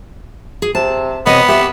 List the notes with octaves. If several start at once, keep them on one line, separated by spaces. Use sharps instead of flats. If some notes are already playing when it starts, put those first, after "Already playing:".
G#4
C3 A5
C3 B3 C#5 D#5
G4 B4 E5